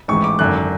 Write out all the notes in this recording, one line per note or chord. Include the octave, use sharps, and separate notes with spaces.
A1 G#2 E3 C#6
D6
G#1 F#2 D3 F#6